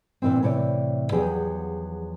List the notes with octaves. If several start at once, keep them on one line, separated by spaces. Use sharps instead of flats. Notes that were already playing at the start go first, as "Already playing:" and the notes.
A#2 E3 C4
A2 C3 E3 C#5 D5
E2 F3 F#3 G4 G#4